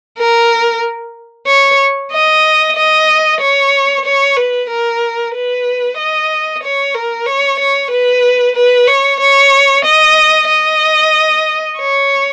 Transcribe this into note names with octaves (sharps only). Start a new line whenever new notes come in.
A#4
C#5
D#5
D#5
C#5
C#5
B4
A#4
B4
D#5
C#5
A#4
C#5
C#5
B4
B4
C#5
C#5
D#5
D#5
C#5